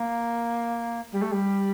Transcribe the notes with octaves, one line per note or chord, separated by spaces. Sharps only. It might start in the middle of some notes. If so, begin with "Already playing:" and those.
Already playing: A#3
G3
A3
G3